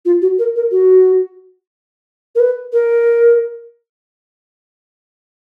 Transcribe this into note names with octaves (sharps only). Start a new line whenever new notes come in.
F4
F#4
A#4
A#4
F#4
A#4
B4
A#4